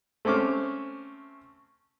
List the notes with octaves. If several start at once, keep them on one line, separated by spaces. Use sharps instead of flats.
A3 C4 C#4 D6 F6